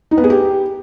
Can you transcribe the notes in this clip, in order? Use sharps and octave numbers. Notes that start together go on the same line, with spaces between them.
D#4
B3
G#4
G4